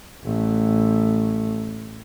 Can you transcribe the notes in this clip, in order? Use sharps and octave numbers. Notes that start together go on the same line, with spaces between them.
A1 A3